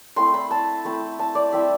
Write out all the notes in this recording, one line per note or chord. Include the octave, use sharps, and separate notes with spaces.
A3 C4 E4 C6
B5
A5
A3 C4 E4
A5
D5
G3 C4 E4 E5